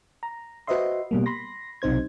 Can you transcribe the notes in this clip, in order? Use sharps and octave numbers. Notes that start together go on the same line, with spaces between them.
A#5
F#4 B4 C5 D#5 E5 C6
B2 G3 A#3
B5 C6 A#6
B1 C3 D#4 C5 G#6